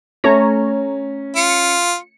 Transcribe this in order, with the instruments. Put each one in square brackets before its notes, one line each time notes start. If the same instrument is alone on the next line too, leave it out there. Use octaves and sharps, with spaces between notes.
[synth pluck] A3 C#5 A#5 [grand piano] C#4
[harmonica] F4 [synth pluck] C#7